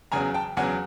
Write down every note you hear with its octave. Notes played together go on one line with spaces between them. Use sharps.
E2 C#3 F#3 G#5 A#5
G5 A5
E2 C#3 F#3 F#5 G#5